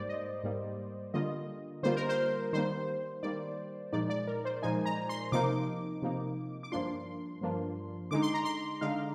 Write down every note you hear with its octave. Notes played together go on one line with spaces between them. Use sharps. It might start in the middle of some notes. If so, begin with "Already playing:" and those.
Already playing: G#2 G3 A#3 C5 D5
D#5
G#2 G3 A#3
D3 G3 A#3 F4 D#5
D3 G3 A#3 F4 C5
A#4
C5
D#3 G3 A#3 C5
D#3 G3 A#3 D5
A#2 F3 G#3 D#4 D5
D5
A#4
C5
A#2 F3 G#3 D#4 G#5
A#5
C6
C3 F3 A#3 D#4 D6
C3 F3 A#3 D#4
D6
G2 F3 A#3 D4 F4 C6
G2 F3 A#3 D4 F4
D3 G#3 D#4 D6
C6
A#5
C6
D3 G#3 D#4 F5